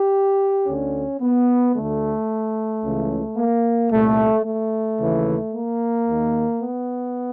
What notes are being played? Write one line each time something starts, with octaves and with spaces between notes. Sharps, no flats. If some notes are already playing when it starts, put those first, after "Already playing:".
Already playing: G4
D2 D3 C#4
B3
D2 D3 A3
C#2 C#3 E3
A#3
C2 A#2 A3
A3
D#2 C#3 E3
A#3
D#2 D#3
B3